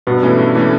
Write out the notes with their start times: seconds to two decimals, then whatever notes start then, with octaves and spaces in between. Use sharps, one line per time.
0.07 G2 B2 B3
0.23 E3 A3 C#4
0.38 G2
0.55 E3 A3 C#4